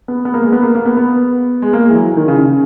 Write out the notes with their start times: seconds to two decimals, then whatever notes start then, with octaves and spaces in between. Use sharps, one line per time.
0.08 B3
0.25 B3
0.34 A#3
0.42 G#3
0.53 B3
0.63 A#3
0.75 A#3
0.85 B3
0.97 B3
1.62 G#3
1.73 A#3
1.85 G#3
1.90 E3
1.96 F#3
2.17 D#3
2.28 C#3
2.38 C#3